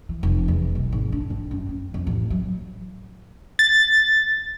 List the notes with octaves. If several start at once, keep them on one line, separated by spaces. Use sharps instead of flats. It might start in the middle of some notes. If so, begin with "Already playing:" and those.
E3
F1
E2
B1
G#1
D4
C4
F#2
C4
F2
A1
F#3
A6